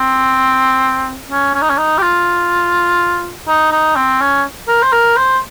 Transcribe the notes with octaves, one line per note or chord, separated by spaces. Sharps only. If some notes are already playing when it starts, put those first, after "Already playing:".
Already playing: C4
C#4
C#4
D#4
C#4
D#4
G4
F4
D#4
D#4
C4
C#4
A#4
C5
A#4
C5